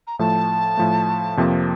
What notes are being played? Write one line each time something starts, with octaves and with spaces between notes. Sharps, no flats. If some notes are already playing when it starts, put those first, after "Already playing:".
A#5
A2 F3 A3 A5
A2 F3 A3
F2 C3 F3 A#3